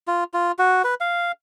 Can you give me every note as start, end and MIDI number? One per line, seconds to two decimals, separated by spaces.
0.08 0.24 65
0.34 0.52 65
0.59 0.82 66
0.84 0.94 71
1.00 1.32 77